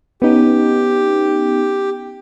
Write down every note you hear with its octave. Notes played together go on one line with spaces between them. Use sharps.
B3 C#4 D#4 G4